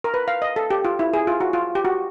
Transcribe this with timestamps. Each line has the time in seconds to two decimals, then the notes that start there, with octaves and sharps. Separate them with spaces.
0.04 A#4
0.14 B4
0.28 F5
0.42 D#5
0.56 A4
0.71 G4
0.85 F4
0.99 E4
1.14 G#4
1.27 F4
1.40 F#4
1.53 F4
1.75 G4
1.85 F#4